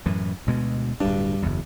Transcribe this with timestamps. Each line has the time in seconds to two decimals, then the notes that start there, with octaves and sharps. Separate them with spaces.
0.06 F#2 A2 E3
0.47 D2 B2 G#3
1.00 D1 G2 D4
1.42 F#1 E2